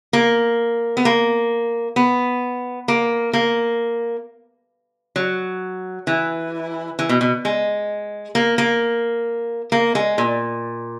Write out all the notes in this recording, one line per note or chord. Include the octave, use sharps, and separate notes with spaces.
A#3
B3
A#3
B3
A#3
A#3
F#3
E3
E3
B2
B2
G#3
A#3
A#3
A#3
G#3
A#2